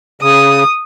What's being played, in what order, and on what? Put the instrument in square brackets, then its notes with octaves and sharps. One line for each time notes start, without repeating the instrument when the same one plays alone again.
[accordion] C#3 [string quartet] D#6